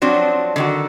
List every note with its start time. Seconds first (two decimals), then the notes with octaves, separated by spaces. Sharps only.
0.02 F3 F#3 C4 D4 F#4
0.56 D3 D#3 F#4